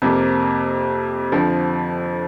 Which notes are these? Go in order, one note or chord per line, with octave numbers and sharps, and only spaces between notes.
F2 C3 A#3
F2 D3 F3